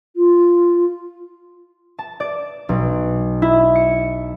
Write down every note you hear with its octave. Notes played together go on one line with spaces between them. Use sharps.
F4
A5
D5
B1
E4
C#7